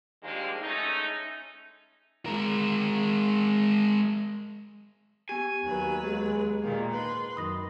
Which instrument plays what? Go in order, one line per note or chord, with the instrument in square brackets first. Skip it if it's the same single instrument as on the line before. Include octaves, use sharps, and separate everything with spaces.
[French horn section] D3 D#3 F3 G3 G#3 A#3
G#3 A3 C#4 D#4
[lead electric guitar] G#3 A#4
[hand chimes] B3 G4 [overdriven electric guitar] G#5
[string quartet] D#2 F#3 B4 [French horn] D#3
[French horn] G#3
[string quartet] A#2 D#3 A#3
[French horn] G#2 [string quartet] B4 C6
[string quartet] F#2 [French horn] D#3 [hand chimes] B5 D#6 A#6